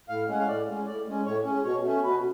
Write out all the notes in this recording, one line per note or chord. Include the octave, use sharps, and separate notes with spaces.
A2 F5
G#3 C#4 F#5
F5
A2 D5
G#3 C#4
A2 D5
G#3 C#4
A2 C#5
G#3 C#4
B2 C#5
A3 C#4
B2 B4